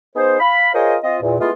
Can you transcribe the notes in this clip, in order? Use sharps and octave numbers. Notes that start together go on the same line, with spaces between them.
B3 D#4 G#4 C5
F5 B5
F4 G#4 A#4 C5 C#5 D#5
C4 F4 D#5
E2 A#2
G#3 A3 B3 E4 F4